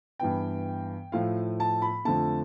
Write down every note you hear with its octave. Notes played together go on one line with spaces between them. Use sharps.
G2 E3 B3 G5
A2 F3 A3 F5
A5
B5
F2 D3 F3 A3 A5